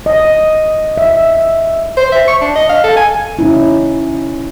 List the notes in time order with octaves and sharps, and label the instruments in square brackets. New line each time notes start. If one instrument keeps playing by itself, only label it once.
[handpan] D#5
E5
[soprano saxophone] C5
E5
C#6
D4
D#5
F5
A4
G#5
[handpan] C#3 C#4 D#4 E4